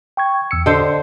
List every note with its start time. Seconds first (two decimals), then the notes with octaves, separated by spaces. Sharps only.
0.17 G5 C#6 G#6
0.51 E2 E6 C#7
0.66 D3 C5 D#5